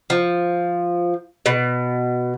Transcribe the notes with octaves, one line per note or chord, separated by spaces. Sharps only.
F3
B2